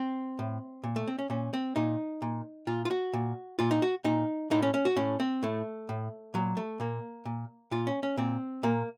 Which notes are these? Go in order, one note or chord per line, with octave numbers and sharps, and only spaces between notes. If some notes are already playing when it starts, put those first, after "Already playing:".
Already playing: C4
A2
A#2
A3
C4
C#4
A#2 C#4
C4
A#2 D#4
A#2
A#2 F4
F4
F#4
A#2
A#2 F4
D#4
F#4
A#2 D#4
A2 D#4
C#4
C#4
F#4
A2 C#4
C4
A2 A3
A2
A#2 F#3
A3
A#2 A#3
A#2
A#2 F4
C#4
C#4
A#2 C4
A#2 A#3